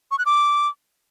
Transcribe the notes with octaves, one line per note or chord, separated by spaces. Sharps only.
C#6
F#6
D6